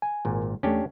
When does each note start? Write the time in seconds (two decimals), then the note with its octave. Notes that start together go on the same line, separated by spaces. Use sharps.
0.02 G#5
0.25 G#1 A#2
0.63 E2 A3 C#4 D4 G4